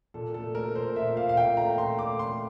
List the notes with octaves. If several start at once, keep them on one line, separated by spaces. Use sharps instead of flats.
A#2 A4
A3 A4
A3 A#4
A#2 C5
A#2 E5
A#2 F5
F5
A#2 G5
A3 A#5
A#2 C6
A3 D6
A3 C6